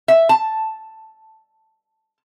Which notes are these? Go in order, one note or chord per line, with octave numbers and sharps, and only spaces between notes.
E5
A5